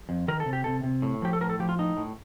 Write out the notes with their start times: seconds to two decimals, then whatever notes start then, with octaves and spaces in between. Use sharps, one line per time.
0.09 F2
0.28 D#3 A#4
0.40 A4
0.46 C3
0.53 G4
0.64 C3 A4
0.84 C3
1.02 A2
1.22 F3 G4
1.33 A4
1.41 A2 A#4
1.50 A4
1.59 F3 G4
1.69 F4
1.79 A2 D#4
1.97 A2